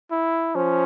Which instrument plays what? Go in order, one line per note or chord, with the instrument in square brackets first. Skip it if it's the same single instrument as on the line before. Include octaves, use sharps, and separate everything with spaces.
[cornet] E4
[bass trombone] F3 [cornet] C#4